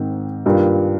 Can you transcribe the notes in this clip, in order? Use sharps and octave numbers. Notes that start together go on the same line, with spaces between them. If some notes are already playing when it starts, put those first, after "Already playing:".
Already playing: G#2 D#3 C4
G2 D#3 A#3 F4